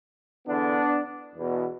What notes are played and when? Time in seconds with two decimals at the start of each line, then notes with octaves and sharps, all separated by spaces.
0.46 E2 D3 B3 D4
1.35 E2 B2